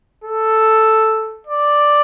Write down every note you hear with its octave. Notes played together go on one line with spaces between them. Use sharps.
A4
D5